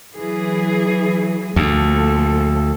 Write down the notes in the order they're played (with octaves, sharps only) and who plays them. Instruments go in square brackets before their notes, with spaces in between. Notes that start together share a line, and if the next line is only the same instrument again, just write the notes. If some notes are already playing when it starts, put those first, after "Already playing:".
[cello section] E3 F#3 G#4
[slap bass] D2 [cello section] F3 A#3 A4